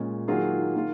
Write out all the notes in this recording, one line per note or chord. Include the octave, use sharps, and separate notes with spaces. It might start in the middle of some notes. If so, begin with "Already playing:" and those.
Already playing: A#2 G#3 C#4 G#4
D#3 F#3 A#3 F4 G#4
D#3 A#3 F4